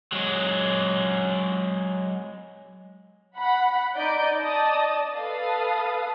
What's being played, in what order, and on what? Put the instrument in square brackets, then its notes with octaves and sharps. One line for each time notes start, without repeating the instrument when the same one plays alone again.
[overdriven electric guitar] F#3 G#3
[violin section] F#5 B5
D#4 D5 D#5 G6 D7
D5 D#5 A5 D#6
A4 B4 F5 D#6